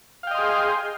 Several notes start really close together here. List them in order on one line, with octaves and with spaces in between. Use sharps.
F5 G5 D#5 C6 G#4